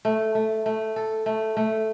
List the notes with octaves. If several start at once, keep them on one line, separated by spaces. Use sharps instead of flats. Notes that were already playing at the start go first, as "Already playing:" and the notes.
A3
A3
A3
A4
A3
A3